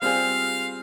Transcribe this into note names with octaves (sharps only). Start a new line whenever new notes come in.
G3 C4 F4 G#4 C5 F5